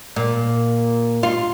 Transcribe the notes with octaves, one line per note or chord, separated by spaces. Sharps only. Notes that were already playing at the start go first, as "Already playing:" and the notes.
A#2
F4